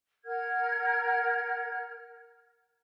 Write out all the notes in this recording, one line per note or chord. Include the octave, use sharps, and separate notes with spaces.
A#4 F#5 F6 G#6